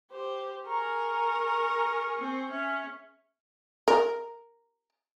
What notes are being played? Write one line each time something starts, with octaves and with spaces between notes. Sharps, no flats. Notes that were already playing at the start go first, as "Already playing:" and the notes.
G4 C5
G#4 A#4 A#5 C#6
C4
C#4 E5
A#4